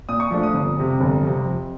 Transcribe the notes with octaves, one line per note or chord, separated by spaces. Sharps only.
A#2 D#6
C#6
F3 A3 D4 F4
D#6
G1
F2 C3
G1
F2 C3
F2